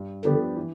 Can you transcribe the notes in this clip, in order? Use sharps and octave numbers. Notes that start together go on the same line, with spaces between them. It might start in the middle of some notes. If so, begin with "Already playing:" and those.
Already playing: G2
D3 F3 B3 D4 G4
E3